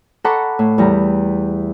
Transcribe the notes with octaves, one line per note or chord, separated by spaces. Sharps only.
A4 F#5 A#5 B5 C#6 D6
A2
E2 G3 A#5